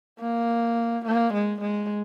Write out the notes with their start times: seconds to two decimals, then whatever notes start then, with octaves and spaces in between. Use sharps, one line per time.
0.20 A#3
1.05 A#3
1.34 G#3
1.62 G#3